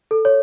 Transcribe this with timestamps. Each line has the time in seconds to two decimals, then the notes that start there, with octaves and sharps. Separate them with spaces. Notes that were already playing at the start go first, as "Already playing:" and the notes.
0.11 A4
0.25 C#5